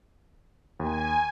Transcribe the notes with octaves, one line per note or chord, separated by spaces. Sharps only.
D#2 G#5